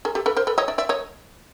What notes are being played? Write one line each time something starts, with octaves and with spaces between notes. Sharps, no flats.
G#4 A#4
G4 A4
A4 B4
A#4 C5
A4 B4
C#5 D#5
D5 E5
D5 E5
C#5 D#5